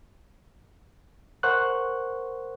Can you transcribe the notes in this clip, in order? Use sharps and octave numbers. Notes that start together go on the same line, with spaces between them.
A#4 C5 F#5 C#6 F#6